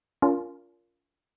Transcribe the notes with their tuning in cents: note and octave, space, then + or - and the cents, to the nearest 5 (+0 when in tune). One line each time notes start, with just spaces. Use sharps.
C#4 +45 F4 +0 A#4 +0